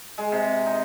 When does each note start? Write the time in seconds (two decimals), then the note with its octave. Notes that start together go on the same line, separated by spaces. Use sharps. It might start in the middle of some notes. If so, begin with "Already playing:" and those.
0.18 G#3
0.32 C3
0.66 D#4